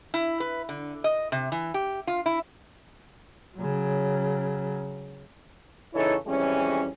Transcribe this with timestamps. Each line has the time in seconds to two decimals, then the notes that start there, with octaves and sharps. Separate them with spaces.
0.14 E4
0.40 B4
0.69 D3
1.04 D#5
1.32 C3
1.52 E3
1.74 G4
2.07 F4
2.26 E4
3.57 C#3 F#3
5.93 C#3 E3 D#4 E4 A4 C#5
6.27 F2 E3 G3 G#3 C#4